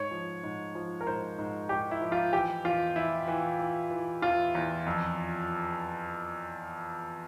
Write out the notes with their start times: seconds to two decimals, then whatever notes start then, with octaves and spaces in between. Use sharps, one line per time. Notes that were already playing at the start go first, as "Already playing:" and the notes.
Already playing: G#2 C#5
0.11 F3
0.44 G#2
0.75 F3
1.01 A#4
1.07 G#2 C5
1.39 G#2
1.69 G#2 G4
1.91 E4
2.01 F3
2.12 F4
2.33 E3 G4
2.64 E2 F4
2.96 E3 E4
3.28 E3
3.59 E3
3.91 E3
4.22 E2 F4
4.55 E2
4.86 F2